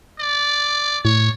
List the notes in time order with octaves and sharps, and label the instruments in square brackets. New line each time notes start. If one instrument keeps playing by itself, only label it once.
[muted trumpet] D5
[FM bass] A2 [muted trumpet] C#5